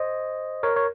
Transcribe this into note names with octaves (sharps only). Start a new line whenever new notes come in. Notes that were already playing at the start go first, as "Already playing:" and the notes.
Already playing: C5 D#5
A#4 C#5
C#5